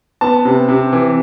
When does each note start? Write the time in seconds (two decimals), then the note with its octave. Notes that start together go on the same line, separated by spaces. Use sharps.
0.21 B3 A5
0.45 C3
0.69 C3
0.93 E3